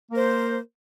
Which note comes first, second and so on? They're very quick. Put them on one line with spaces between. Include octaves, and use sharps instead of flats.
A#3 A#4 C5